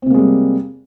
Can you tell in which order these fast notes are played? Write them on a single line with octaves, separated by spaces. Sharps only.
C4 C3 A#3 G#3 G3